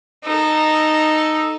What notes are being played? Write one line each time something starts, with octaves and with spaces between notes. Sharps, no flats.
D#4 A4